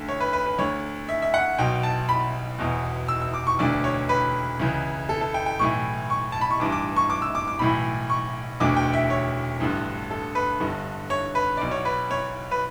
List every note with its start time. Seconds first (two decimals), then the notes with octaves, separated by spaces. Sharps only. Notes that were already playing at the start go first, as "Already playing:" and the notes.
Already playing: D2 D3
0.08 C#5
0.20 B4
0.33 B4
0.46 B4
0.58 D2 D3 C#5
1.09 E5
1.22 E5
1.34 F#5
1.58 B1 B2 G5
1.83 A5
2.09 B5
2.59 E1 E2 B2
3.08 E6
3.22 E6
3.33 D6
3.47 C#6
3.59 E1 D2 D3 D5
3.84 C#5
4.09 B4
4.59 C#2 C#3 E3
5.09 A4
5.21 A4
5.34 G5
5.46 G5
5.59 B1 A2 E3 C#6
6.10 C#6
6.32 A5
6.41 B5
6.50 C#6
6.60 A1 G2 E3 D6
6.72 D6
6.96 C#6
7.10 D6
7.22 E6
7.35 D6
7.48 D6
7.59 B1 A2 E3 B5
8.10 C#6
8.60 E1 D2 D3 D6
8.76 G5
8.93 E5
9.10 C#5
9.60 A1 G2 D3
10.11 A4
10.35 B4
10.60 G1 G2 D3
11.10 C#5
11.35 B4
11.57 B1 B2 D5
11.71 C#5
11.85 B4
12.11 C#5
12.51 B4